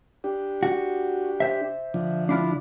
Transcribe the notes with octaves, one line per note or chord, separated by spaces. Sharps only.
D4 G4
F#4
C5 E5
D3 F3
D4 E4 F4